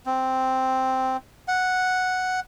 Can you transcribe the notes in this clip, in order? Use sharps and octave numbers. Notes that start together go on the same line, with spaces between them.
C4
F#5